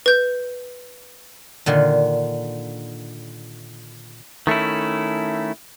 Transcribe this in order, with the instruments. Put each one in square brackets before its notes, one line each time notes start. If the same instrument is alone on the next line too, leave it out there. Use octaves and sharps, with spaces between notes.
[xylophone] B4 G6
[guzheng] A#2 D3 D#3
[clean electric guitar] D#3 A3 C#4 E4